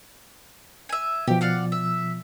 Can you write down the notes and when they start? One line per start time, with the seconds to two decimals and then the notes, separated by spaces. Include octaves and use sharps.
0.89 E5 G#5
1.28 B2 F3 G4
1.41 D5 F5 F#5
1.72 E5